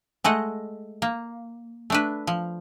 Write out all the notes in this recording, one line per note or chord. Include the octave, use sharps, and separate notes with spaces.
G#3 A3 D#5 F#5
A#3
A3 D4 B4
F3